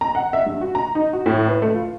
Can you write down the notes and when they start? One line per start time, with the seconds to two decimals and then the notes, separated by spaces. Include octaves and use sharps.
0.01 A#5
0.15 F#5
0.33 E5
0.46 G2
0.61 F#4
0.75 A#5
0.95 D#4
1.13 F#4
1.26 A2
1.48 B4
1.62 A3
1.74 F4